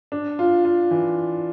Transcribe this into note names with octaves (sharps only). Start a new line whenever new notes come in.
D4
F4
F4
E3